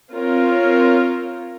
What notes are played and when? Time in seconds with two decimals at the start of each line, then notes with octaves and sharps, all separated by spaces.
0.12 C4 F4 A#4 C#5